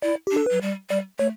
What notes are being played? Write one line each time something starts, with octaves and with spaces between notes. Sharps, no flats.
E4 D5
D4 G4
A4
F#3 B4
G3
G3 D5
A3 C#5